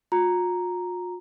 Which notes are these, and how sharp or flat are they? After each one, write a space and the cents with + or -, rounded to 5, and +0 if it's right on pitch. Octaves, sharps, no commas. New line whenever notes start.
F4 +45 A#5 +0